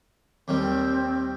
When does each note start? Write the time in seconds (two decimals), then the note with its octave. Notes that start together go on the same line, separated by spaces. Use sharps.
0.48 D#2 D#3 G3 C4